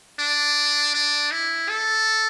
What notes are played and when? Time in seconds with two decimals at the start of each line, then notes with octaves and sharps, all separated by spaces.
0.20 D4
0.95 D4
1.32 E4
1.69 A4